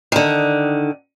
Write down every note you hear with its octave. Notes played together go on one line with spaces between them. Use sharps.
D3 D#3